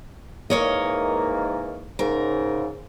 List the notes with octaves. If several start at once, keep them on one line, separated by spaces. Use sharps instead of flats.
G#2 E3 A#3 A#4 C#5 D#5
G#2 C#3 A#4